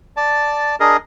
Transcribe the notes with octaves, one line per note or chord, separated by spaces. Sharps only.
D5 A5
D4 G#4 A#4 D#5